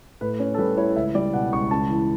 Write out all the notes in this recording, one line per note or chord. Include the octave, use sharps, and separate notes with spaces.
A2 B4
C#4 C#5
A4
G3 B4
E4 C#5
C#2 E5
G3 D5
B2 F#5
C#2 C#6
C#2 A5
E3